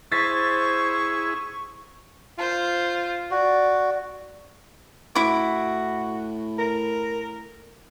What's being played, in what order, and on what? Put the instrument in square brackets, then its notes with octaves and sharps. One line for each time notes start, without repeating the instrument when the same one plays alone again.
[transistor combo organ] E4 G#4 [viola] C5 [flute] C#6 [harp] A6 B6 C7
[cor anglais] F4 [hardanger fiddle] C5
[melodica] F#4 [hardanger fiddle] D5
[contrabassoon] A2 [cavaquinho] E4 D6 [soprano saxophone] F#4
[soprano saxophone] A#4